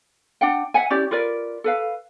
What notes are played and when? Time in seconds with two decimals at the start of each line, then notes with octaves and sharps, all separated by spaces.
0.41 D4 F#5 G5
0.74 E5 F#5 G#5
0.90 C#4 E4 G4 D5
1.11 F4 A#4 B4 D5
1.64 A4 B4 F5